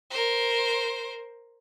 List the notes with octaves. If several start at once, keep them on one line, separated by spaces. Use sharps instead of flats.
A#4 C5